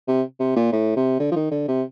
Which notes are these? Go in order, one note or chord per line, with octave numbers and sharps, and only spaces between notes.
C3
C3
A#2
A2
C3
D3
F3
D#3
D3
C3